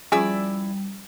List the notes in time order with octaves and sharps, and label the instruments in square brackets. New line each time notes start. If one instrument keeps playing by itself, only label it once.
[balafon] F3 C#4 F4 [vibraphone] G3 [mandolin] E4 D5 E6 [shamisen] G#4